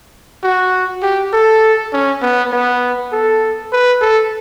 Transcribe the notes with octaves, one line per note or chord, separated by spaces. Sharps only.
F#4
G4
A4
C#4
B3
B3
A4
B4
A4